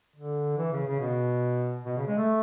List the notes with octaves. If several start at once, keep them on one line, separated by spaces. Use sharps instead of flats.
D3
E3
C#3
C#3
B2
B2
C#3
G#3
A3